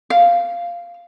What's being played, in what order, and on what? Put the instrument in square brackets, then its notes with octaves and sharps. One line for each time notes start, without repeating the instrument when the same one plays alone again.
[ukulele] F5